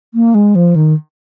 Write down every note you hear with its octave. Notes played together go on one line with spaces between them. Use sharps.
A#3
G#3
F3
D#3